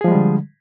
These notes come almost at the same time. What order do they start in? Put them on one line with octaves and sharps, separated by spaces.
G#4 F3 G#3 G3 D3